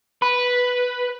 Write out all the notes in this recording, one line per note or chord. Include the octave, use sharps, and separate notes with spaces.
B4